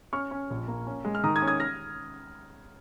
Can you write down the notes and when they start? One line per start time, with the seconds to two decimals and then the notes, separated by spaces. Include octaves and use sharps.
0.13 C#4 C#6 F6
0.31 C#4
0.50 A#1
0.68 A#3
0.87 C#4
1.05 G#3
1.15 F6
1.24 D#3 A#5 D#6
1.36 D#6 G#6
1.42 C#4
1.47 D#6 G#6
1.60 F6 A#6